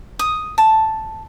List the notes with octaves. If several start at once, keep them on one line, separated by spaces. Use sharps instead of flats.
D#6
A5